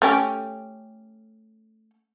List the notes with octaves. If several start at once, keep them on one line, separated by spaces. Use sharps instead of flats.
A3 C#4 G4